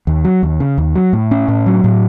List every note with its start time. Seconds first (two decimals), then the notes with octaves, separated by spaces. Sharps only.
0.07 D#2
0.25 F#3
0.43 D#2
0.60 C#3
0.78 D#2
0.96 F#3
1.13 A2
1.31 C#4
1.48 A2
1.66 F#3
1.84 A2